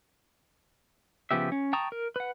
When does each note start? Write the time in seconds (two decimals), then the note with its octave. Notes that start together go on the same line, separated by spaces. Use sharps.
1.31 C#3 F3 B3 G4 E5
1.52 C#4
1.73 G5 A5 A#5 C#6 D#6
1.92 A#4
2.16 B4 F#5